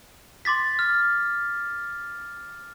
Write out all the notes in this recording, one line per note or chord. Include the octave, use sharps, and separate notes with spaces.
C6 D6 A6 B6
F6